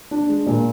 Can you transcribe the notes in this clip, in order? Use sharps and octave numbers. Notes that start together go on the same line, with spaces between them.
D4
G#3
A#2